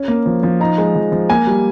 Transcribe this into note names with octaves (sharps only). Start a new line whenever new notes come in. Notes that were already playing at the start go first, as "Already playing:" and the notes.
Already playing: C#4
A#3
F3
F3
D#4 A#5
G#3
F3
F3
A#3 G#5
G3